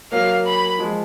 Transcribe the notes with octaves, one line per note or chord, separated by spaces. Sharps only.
F#3 A#3 F5
B5
F3 G#3